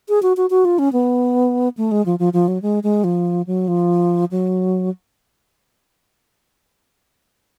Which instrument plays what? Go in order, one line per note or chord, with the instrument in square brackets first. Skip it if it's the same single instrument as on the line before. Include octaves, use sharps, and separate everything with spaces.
[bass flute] G#4
F#4
F#4
F#4
F4
C#4
B3
A3
G#3
F3
F3
F3
F#3
G#3
G#3
F3
F#3
F3
F#3